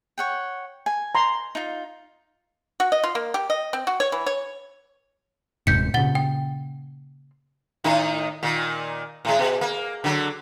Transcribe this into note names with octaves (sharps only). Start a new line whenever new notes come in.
C#5 F#5 G5
G#5
A#5 C6
D#4 F4
F#4
D#5
F4
A#3
G4
D#5
C4
F#4
C#5
E3
C#5
D#1 G#2 C3 G6 B6 C#7
A#2 C#3 F#5 A6 G7
G5
A2 D#3 D#4
A#2 D#3
A2 G#3
B2
A#3
D3 F#3